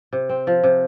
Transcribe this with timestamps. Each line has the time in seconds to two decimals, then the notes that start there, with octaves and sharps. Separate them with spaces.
0.13 C3
0.29 C4
0.47 F3
0.63 C3